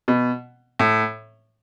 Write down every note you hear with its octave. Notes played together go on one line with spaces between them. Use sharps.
B2
A2